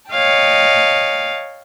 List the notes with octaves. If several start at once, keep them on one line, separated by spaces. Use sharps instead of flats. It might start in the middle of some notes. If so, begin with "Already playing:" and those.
C#5 D#5 F5 G5 A5